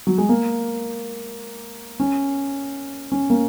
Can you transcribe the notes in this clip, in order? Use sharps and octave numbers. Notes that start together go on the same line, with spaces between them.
F#3
G#3
A#3
C#4
C#4
A#3